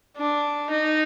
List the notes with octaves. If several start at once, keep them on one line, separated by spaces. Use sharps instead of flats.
D4
D#4